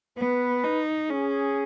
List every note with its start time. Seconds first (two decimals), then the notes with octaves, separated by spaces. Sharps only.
0.18 B3 B4
0.64 D#4
1.10 C#4 G#4